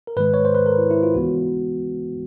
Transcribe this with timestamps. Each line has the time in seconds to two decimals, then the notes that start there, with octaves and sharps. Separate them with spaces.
0.07 A#4
0.17 G#2 D#3 G#3 B4
0.34 C#5
0.45 C5
0.55 B4
0.66 A#4
0.78 E4
0.90 E4
1.03 F4
1.14 C#2 C#3 E3 G#3 B3 F#4